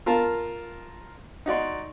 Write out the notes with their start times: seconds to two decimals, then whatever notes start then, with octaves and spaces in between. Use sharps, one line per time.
0.06 F4 A#4 F5 A5
1.46 D#4 F#4 D5 C6